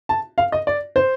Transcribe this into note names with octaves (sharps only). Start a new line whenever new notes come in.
A5
F5
D#5
D5
C5